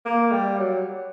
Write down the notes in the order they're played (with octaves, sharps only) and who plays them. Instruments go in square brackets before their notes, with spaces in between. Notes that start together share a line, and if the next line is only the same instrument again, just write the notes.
[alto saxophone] A#3
G3
F#3